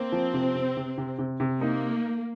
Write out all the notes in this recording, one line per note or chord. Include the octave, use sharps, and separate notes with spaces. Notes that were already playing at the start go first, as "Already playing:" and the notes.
Already playing: A#3 C4
F3
C3
C3
C3
C3
C3
C3
A#3 D#4